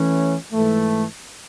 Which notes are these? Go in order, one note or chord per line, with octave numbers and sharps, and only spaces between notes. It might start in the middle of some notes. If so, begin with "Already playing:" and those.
Already playing: E3 A3 C#4
G#2 E3 A3